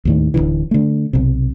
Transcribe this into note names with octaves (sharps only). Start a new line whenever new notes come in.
D#2 A2 D#3
D1 D2 D3 E3
D3 A3
B1 C3